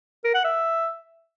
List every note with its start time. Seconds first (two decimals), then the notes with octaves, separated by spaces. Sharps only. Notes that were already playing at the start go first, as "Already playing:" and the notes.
0.24 A#4
0.34 F#5
0.44 E5